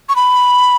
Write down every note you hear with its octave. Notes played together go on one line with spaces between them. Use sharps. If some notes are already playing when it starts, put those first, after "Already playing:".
C#6
B5